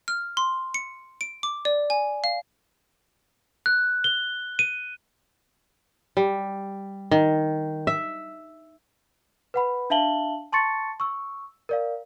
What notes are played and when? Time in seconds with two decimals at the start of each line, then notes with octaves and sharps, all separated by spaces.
0.08 F6
0.37 C6
0.74 C#7
1.21 D7
1.43 D6
1.65 D5
1.90 G#5
2.24 F5
3.66 F#6
4.04 G7
4.59 D#7
6.17 G3
7.11 D#3
7.87 E5
9.54 B4 F#5 B5
9.90 D4 E5 F5 A5 F#7 G7
10.53 A5 C6 C#6 A6 C#7
11.00 C#6 E6
11.69 A#4 D5 F5